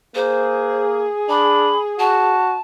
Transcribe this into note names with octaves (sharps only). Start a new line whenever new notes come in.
A#3 G#4 C5
D4 B5
F#4 A5